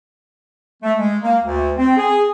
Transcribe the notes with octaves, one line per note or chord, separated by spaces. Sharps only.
A3
G#3
A#3
D2
C4
G#4